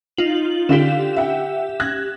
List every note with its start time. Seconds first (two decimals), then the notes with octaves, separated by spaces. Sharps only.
0.17 D#4 F4 F#7
0.69 D3 F4 G4 B6 E7
1.17 E5 F#5 G5
1.80 F#6 G#6 A#6